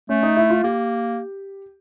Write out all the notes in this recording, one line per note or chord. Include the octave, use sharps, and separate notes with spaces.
A3 C#4
D#4
E4
F4
A#3 G4